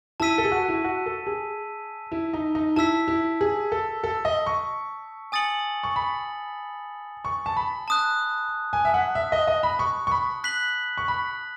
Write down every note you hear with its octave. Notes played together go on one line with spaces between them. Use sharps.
E4 A5 E6 B6 D#7
A4
G#4
F#4
E4
F#4
A4
G#4
E4
D#4
D#4
E4 A5 E6 B6
E4
G#4
A4
A4
D#5
C#6
G#5 D#6 A6 C#7 F#7
C#6
B5
C#6
A5
B5
A5 D#6 F#6
G#5
E5
F#5
E5
D#5
D#5
B5
C#6
C#6
B5
F#6 B6 F#7
C#6
B5